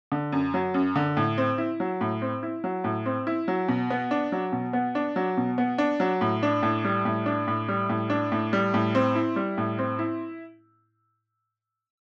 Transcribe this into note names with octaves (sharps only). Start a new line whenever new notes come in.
D3
F#2
F#3
F#2
D3
A2
C4
E4
F#3
A2
C4
E4
F#3
A2
C4
E4
F#3
B2
B3
D4
F#3
B2
B3
D4
F#3
B2
B3
D4
F#3
A2
D4
A2
G3
A2
D4
A2
G3
A2
D4
A2
G3
A2
C4
E4
G3
A2
C4
E4